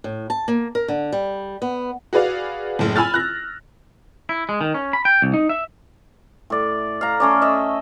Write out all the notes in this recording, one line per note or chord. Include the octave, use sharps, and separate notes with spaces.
A2
A5
A#3
A#4
D3
G3
B3
F#4 G#4 B4 D5 F5
F#1 A2
G#5 B5 E6 F6 A6
F#6 A#6
E4
G#3
D#3
C#4
B5
G5
C2
D#4
E5
A2 D5
F5 A#5
A3 C#4 D5
D#5 E5